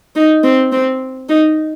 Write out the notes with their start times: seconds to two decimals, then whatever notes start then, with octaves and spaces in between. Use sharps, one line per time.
0.16 D#4
0.43 C4
0.72 C4
1.29 D#4